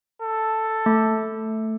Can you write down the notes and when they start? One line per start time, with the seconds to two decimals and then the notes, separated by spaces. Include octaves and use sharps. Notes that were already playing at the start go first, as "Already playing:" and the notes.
0.22 A4
0.86 A3